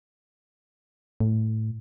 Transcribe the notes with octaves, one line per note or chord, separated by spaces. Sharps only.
A2